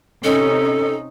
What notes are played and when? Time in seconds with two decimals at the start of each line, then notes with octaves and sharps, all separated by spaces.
0.24 C3 C#4 D#4 A4